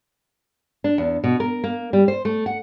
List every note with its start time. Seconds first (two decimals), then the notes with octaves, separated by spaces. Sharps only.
0.84 D4
0.98 E2
1.24 B2
1.40 A#4
1.64 A#3
1.93 G3
2.08 C5
2.25 A3
2.46 F#5